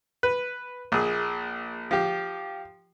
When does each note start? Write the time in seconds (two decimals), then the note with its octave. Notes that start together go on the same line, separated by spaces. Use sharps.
0.23 B4
0.92 A#1 G#4
1.91 F3 G4